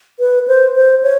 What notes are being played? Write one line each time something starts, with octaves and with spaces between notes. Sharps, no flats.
B4
C5
C5
C#5